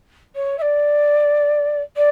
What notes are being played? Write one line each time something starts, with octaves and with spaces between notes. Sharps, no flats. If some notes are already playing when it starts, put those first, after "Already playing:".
C#5
E5
D5
D5